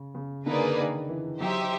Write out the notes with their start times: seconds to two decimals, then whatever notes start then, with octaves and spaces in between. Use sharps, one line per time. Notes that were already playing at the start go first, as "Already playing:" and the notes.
Already playing: C#3
0.15 C#3
0.46 D3 A#3 D#4 G#4 B4 D5
0.77 D#3
1.09 E3
1.40 F#3 D#4 G4 C5 E5